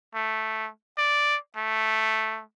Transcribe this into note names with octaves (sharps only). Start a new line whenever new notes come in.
A3
D5
A3